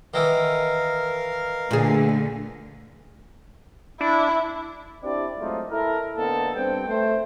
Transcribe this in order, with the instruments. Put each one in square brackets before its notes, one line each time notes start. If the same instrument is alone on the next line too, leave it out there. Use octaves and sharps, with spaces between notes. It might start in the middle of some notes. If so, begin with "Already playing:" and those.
[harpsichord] D#3 E3 [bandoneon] A#4 F5
[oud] A#2 G#4 [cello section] D3 A3
[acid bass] D4 [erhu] E4
[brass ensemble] C4 D4 E4 G4 D5
F#3 G#3 A3 C4 D#4 F4
E4 A4 A#4
D3 A#3 B3 D4 D#4 A4
G2 C4 G5
A3 C5